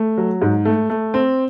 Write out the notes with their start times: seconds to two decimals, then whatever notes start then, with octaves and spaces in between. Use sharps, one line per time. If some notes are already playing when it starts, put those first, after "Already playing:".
Already playing: A3
0.18 F#3
0.42 G#2
0.65 A3
0.90 A3
1.14 C4